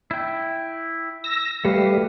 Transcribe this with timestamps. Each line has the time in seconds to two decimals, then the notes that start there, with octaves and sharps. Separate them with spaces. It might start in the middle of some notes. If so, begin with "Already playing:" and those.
0.11 E4 G5
1.24 E6 A#6
1.65 G3 A3 G4 B4 F5